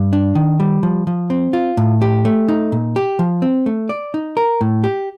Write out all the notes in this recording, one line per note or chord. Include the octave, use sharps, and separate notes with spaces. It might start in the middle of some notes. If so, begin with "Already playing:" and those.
Already playing: G2
D4
D#3
G3
F3
F3
C4
F4
A2
G4
A3
D#4
A#2
G4
F3
C4
A3
D5
D#4
A#4
A2
G4